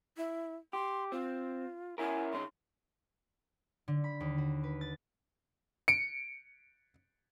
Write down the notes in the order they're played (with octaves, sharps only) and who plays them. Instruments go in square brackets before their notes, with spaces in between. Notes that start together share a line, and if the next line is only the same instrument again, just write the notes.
[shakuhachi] E4
[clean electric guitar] G4 [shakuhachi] C6
[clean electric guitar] C4 [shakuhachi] F4
[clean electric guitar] C#4 E4 A#4 [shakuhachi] G#5
[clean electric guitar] C#3 C#4 D#4 [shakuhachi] C6
[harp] D3
B5
D#2
F#4
B4
A6
[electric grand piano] C#7 D7